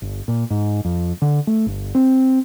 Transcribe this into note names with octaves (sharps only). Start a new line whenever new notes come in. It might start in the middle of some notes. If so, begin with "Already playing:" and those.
G1
A#2
G#2
F2
D3
A3
G1
C4